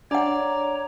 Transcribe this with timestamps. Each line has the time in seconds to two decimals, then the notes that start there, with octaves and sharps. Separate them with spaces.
0.11 D4 C#5 D5 F#5 A#5